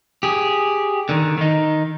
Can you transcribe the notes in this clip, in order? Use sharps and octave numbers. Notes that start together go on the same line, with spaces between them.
G4 G#4
D3 D#3
D#3 D#4